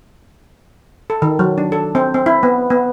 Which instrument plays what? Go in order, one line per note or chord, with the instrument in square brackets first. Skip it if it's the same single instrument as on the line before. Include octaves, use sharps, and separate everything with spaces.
[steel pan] A4
D#3
F#3
D4
A4
C4
C4
E4
B3
B3